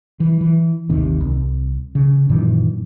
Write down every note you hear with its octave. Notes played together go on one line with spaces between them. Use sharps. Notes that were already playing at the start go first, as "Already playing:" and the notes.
E3
E3
G#1 D#2 C3 D#3
C2
C#3
F#2 A#2 D#3 E3